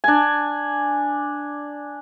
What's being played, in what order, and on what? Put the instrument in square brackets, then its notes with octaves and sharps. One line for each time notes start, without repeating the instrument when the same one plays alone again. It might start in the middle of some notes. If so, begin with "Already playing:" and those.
[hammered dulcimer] D4 G#5